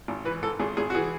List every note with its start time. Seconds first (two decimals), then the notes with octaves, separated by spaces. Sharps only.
0.08 G#1
0.25 E3 B4
0.43 G#2 A4
0.60 G#1 G#4
0.77 G#1 G#4
0.90 F#4
0.95 E3 G#4